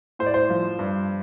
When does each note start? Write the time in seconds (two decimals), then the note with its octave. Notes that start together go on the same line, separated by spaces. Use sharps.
0.19 A2 C5
0.26 D5
0.34 C5
0.50 F3
0.79 G2